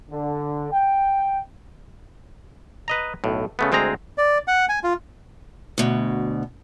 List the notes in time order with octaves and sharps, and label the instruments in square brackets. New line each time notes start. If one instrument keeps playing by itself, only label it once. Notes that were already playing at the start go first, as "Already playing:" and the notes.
[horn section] D3
G5
[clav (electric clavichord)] B4 D#5 A#5
B1 A2
C#3 A3 B3
D2 G#3 C4 G#4 A#5
[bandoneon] D5
F#5
G#5
F4
[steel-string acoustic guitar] D2 B2